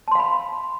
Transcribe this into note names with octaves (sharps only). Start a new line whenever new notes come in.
F5 A5 B5 C6